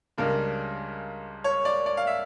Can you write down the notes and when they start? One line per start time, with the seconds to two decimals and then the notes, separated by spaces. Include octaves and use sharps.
0.18 C#2 C#3 G3 D4 A#4
1.44 C#5
1.65 D5
1.86 D5
1.97 F5
2.07 E5